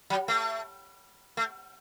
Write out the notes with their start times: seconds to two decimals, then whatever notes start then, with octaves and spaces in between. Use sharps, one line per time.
0.10 F#3
0.28 A3
1.37 A3